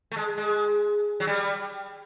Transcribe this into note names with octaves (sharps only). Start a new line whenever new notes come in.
A3
G#3
G#3
F#3
G3